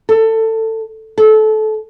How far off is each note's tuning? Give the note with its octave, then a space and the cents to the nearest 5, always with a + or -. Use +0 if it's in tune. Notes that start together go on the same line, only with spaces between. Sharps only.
A4 +20
A4 -25